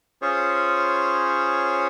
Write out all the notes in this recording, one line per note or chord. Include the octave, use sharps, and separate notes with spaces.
C#4 F4 G#4 C5 C#5